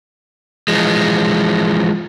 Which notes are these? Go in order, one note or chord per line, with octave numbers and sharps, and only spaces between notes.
E3 F3 G#3